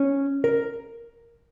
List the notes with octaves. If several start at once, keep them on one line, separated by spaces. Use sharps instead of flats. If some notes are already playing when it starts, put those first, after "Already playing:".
Already playing: C#4
A#4